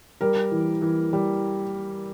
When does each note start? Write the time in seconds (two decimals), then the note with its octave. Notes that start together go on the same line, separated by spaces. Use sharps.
0.21 G3 A#4
0.51 E3
0.82 E3
1.13 G3